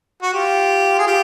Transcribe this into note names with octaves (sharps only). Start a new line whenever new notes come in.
F#4
F4 G4
G#4
F4 G4